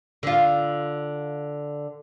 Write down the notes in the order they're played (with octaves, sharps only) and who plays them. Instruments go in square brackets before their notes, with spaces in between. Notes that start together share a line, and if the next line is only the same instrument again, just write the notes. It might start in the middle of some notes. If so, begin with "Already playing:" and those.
[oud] D3 F4